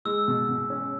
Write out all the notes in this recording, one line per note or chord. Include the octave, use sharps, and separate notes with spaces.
G#3 E6
B2
B2
C#4